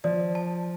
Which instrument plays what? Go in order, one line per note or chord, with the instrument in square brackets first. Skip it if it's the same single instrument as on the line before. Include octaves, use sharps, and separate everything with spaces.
[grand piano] F3 [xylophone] D5
[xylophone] A5